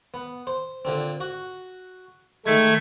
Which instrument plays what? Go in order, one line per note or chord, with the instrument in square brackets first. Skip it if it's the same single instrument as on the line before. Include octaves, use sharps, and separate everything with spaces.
[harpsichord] B3
C5
A#2 D3 C4
F#4
[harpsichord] D#3 G#3 [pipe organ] A3 G#6